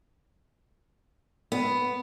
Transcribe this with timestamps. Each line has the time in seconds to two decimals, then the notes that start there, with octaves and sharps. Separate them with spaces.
1.52 B3